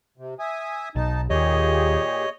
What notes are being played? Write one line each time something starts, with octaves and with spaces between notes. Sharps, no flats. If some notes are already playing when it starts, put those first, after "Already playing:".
C3
E5 G#5 D#6
B1 D#4 A5
D#2 A#2 G4 G#4 C#5 D#5